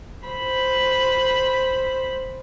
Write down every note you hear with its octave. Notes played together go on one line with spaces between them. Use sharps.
C5 B5